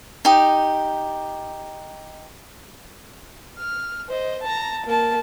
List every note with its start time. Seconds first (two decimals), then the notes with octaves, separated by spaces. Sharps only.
0.25 D#4 G4
3.59 F6
4.09 C5 D#5
4.43 A5 A#5
4.87 A#3 A5